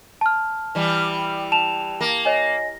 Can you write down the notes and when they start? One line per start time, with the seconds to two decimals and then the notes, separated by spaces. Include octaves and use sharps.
0.21 A5 F6
0.75 E3 G3
1.52 A5 E7 F7
2.01 A#3
2.25 C#5 D#5 G#5